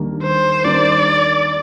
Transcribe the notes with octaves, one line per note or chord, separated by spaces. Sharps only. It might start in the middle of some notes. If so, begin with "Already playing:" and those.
Already playing: D#2 D#3 G3 A#3 D4
C5
D#2 D#3 G3 A#3 D4 D5